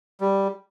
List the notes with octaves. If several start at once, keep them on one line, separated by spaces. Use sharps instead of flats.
G3